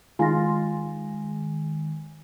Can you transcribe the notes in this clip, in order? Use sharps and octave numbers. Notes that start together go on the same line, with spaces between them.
D#3 G#3 F4 G#5 A#6